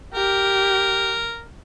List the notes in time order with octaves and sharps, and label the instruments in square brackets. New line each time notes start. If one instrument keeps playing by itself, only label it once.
[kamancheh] G4 [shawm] A#4